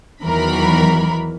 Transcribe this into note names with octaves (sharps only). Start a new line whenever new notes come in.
E2 D#3 E3 F#3 A#4 B5